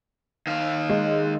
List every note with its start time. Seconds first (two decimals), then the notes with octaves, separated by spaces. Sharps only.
0.47 D#3 F5
0.89 G#3